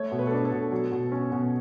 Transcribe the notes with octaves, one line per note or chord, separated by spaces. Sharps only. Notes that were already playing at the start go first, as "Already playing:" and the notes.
Already playing: A3 C#5
B2
B4
A4
D4 B4
A4
B2
F#3
B2
C#4
B2